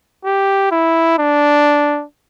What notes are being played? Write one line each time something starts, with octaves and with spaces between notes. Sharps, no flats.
G4
E4
D4